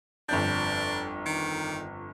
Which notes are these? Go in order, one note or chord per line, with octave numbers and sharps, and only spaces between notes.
G1 F2 D4 G6
D#3